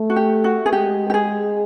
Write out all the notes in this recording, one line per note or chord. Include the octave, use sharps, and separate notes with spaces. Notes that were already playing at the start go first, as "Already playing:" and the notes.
Already playing: A3
F#4
G4
F#4
G#4
G#3 G4
G4
G#4